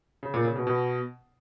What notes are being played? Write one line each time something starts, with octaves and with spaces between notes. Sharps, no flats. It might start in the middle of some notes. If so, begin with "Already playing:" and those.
C#3
A#2
C#3
B2
B2